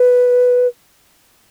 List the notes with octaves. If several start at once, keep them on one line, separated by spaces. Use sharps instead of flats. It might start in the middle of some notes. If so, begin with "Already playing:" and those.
Already playing: B4